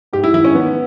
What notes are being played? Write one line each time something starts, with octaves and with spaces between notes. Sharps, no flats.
G#2 G4
E4
D#3 E4
C#4
D#3 B3